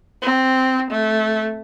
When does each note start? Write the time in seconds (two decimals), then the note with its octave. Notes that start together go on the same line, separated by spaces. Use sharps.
0.22 C4
0.91 A3